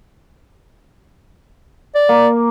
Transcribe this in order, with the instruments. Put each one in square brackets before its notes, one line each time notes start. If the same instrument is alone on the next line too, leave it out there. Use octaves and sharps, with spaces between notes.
[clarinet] D5
[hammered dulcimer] A#3